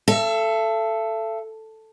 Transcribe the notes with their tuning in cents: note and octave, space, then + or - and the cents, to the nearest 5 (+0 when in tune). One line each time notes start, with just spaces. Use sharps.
A4 +0 E5 +40